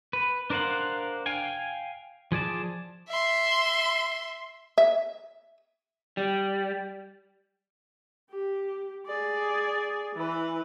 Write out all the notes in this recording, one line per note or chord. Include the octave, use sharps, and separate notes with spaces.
B4
D4 A#4 C5 F5 F#5
F5 G5 G#5
F3 G#4 D5 A5
E5 C6
E5
G3
G4
G#4 D5
E3 B4